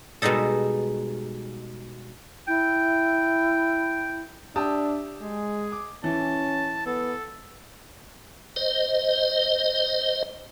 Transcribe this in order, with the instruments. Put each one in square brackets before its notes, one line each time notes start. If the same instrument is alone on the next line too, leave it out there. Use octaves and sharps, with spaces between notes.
[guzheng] B2 G3 G#3 D#4 A4
[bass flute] E4 [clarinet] G5
[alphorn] D4 [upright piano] G4 A5 D#6 [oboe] E5
[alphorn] G#3 [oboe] G#4
[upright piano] D6
[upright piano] E3 [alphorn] C#4 [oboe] A5
[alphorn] B3 [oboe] A4
[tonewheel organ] C5 D#5